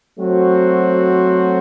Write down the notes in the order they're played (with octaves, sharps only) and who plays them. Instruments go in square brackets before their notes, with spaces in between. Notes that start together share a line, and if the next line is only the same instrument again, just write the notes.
[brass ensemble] F#3 A3 C4 F#4 C5